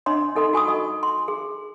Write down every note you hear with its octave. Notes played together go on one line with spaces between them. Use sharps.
D4 C#5 D#5 C6
D#4 A4 D#5 C6
F#4 G#5 C#6 D#6
D#5
C6
G#4